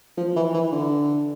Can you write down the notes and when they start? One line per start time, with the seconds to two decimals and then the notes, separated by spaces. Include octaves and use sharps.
0.17 F3
0.36 E3
0.54 E3
0.72 D3